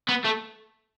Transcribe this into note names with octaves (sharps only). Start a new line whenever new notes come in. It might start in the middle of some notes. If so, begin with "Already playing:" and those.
B3
A3